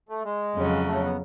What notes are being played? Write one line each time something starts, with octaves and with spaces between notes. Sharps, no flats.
A3
G#3
F2 C#3 F#3
A3
B3